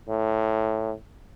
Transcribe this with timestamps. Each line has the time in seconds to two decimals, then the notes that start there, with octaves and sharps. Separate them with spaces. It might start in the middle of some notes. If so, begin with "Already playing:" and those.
0.09 A2